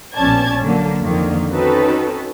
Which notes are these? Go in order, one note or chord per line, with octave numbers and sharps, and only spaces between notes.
A#1 B2 C#4 D5 A5 G#6
D3 F#3 A#3 A4
F2 D3 D#3 A#3
C4 C#4 D#4 F#4 A4 B4